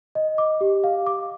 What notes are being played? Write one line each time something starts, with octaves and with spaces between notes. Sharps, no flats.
D#5
D6
G4
F5
D6